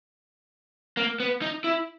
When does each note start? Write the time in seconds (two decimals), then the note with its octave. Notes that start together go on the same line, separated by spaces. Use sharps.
0.97 A#3
1.20 B3
1.42 D#4
1.64 E4